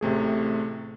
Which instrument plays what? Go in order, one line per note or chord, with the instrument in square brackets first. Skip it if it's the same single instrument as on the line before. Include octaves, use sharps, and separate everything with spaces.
[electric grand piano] A1 C3 A3 G#4